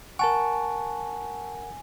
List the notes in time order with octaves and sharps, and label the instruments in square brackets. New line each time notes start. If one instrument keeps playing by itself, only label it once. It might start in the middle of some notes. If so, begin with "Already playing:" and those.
[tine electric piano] A#4 F#5 [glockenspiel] G#5 [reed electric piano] A5 C#6